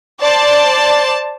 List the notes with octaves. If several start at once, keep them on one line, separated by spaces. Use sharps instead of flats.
C5 D5 A5